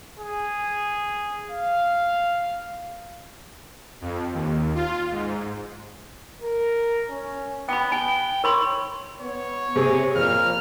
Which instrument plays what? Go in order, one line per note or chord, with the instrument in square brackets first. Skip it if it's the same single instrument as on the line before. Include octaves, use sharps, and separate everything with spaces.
[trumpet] G#4
F5
[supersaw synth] F2
D#2
F4
G#2
[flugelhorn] A#4
C#4
[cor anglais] B3 [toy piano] G5 B5
[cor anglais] G5 [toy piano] G#5
[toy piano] A#4 B5 C6 [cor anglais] C#5
[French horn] B3 [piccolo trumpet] C#5
[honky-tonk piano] C3 [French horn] G#4
[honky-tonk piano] F2 [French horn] A#2 [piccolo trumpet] F6